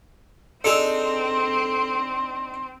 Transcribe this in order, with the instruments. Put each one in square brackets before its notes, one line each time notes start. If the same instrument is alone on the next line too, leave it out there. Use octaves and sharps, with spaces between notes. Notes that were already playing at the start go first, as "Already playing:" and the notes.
[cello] C4 [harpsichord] D4 D#4 G#4 [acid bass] A4 [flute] C6